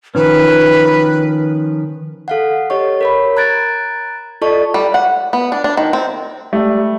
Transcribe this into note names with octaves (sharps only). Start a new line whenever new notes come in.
D#3 F3 C#4 B4
A4 F5 F#5
G4 C#5 D#5 C#6
A#4 C#5 B5
A#5 F#6 G#6 A6 D7
F4 A4 D5 D#5 A5 C#6
G3
F#5
B3
D4
D4
D#3
C4
G3 A3